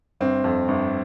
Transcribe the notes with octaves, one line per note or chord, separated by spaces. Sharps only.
G1 C4
F2
G1